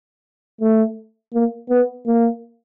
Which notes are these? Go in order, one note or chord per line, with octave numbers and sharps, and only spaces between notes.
A3
A#3
B3
A#3